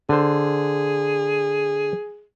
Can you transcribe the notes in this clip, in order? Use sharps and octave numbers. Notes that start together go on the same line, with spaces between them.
D3 G#4 C5